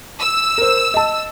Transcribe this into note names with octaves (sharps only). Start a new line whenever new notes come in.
E6
A#4 C5
D#5 A5